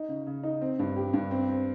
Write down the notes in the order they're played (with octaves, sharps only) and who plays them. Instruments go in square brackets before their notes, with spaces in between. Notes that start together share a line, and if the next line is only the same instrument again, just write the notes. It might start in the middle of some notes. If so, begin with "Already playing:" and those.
Already playing: [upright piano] D#4
C#3
C#3
D#4
C4
G2
G4
G2
C4
C4